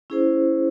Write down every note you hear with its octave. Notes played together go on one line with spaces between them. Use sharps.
C#4 E4 G#4 C5